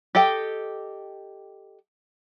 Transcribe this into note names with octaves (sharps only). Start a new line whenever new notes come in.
G4 A4 D#5 G5